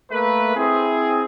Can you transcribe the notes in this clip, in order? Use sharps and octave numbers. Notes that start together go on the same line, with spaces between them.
A3 A#3 B4
C4 E4 G#4